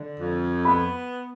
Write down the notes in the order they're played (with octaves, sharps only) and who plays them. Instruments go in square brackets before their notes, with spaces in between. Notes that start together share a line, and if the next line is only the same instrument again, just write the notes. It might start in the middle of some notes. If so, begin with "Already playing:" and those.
Already playing: [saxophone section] D3
F2
[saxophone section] B3 [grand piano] B5